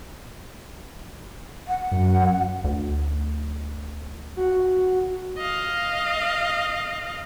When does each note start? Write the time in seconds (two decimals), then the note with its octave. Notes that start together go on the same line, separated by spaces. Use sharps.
1.68 F#5
1.92 F#2
2.64 D2
4.36 F#4
5.38 D#5 F5